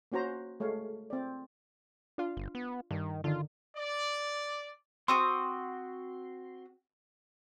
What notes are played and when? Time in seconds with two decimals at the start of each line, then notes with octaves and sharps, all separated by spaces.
0.12 A#3 C#4 F#4 C5 A#5
0.60 G#3 A3 C#5 F5
1.10 C4 D5
2.18 D4 F4
2.37 G1
2.55 B3
2.91 G2 D#3
3.24 D3 D#3 F4
3.76 D5
5.08 C4 F#4 C6 D#6